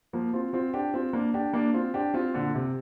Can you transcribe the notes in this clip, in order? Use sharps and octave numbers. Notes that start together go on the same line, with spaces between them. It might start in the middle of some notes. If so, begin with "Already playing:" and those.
F3 A#3
C4 F4
C4 F4
D4 G4
C4 F4
A#3 D4
D4 G4
A#3 D4
C4 F4
D4 G4
C4 F4
A#2 D3
C3